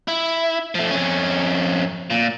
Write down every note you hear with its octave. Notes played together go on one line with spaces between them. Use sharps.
E4
F3 A3
F2 C#4
A#2